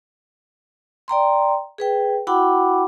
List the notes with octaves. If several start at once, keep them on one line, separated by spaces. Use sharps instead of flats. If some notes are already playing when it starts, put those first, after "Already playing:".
D5 G5 A#5 C6
G#4 B4 G5
E4 F#4 F#5 G5 B5 D6